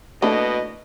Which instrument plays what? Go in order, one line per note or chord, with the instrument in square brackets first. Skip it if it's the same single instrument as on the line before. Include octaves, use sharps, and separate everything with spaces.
[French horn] B2 [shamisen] A3 A4 B4 [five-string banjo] A#3 D4 E4 [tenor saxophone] D#5